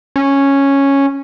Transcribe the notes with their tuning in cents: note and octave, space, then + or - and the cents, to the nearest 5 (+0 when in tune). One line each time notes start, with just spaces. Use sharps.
C#4 -5